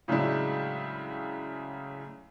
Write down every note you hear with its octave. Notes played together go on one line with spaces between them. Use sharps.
A2 C#3 F#3 G#3 D4 E4